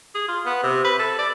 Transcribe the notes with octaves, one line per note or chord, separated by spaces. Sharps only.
G#4
F4
B3
C3
B4
A4
D5